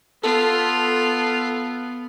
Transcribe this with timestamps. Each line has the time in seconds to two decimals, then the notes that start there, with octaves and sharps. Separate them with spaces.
0.24 B3 F4 A4